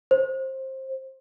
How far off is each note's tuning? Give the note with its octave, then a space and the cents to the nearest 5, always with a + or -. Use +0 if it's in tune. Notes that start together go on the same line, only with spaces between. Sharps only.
C5 +20